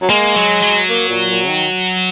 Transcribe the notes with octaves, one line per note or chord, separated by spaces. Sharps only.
F#3
G#3 A#3
F#3
F#3
A#3
A#2
A#2
C#3
D#3